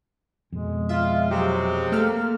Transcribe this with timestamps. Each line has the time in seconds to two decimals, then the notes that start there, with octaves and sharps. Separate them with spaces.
0.52 F2 B2 G#3
0.89 F4 E5
1.30 C3 F#3 G#3 G4
1.92 A3 A#3 A4 F6